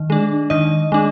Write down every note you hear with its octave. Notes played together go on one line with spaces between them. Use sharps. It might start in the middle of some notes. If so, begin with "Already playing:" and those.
Already playing: D#3
G#3 D4
D#3 D#5
G#3 D4